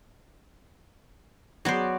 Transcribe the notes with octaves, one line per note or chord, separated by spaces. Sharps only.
F#3 B3 F#4 C5 D5